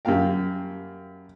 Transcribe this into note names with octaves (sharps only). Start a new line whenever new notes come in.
F#2 G3 A#3 F5 G5